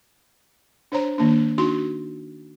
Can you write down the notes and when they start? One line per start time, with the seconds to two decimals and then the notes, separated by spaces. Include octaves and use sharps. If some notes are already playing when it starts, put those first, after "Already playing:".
0.92 D4 C5 C#5 A#5
1.18 D#3 A#3 D4
1.58 D4 D#4 F#4 C6